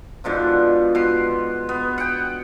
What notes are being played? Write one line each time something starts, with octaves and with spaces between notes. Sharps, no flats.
G#2 B2 D3 F3
B2 C6
B3
F#5 G5